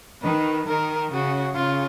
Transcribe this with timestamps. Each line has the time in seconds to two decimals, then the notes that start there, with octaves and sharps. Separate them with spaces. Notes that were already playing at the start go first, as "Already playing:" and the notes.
0.22 D#3 B4
0.66 D#3 A#4
1.12 C#3 F#4
1.55 C#3 F4